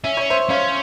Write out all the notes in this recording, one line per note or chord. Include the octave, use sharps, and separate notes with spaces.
C#4 E5
C#5
C5 E5
C#4 C#5 F5